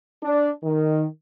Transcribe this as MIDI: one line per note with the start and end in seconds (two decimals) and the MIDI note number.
0.23 0.51 62
0.64 1.06 51